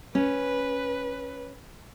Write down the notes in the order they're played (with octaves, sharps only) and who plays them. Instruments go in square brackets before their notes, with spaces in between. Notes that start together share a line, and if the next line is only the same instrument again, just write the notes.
[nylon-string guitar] C#4 [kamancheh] B4